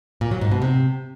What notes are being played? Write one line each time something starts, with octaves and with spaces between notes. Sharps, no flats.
A#2
F#3
G#2
B2
C3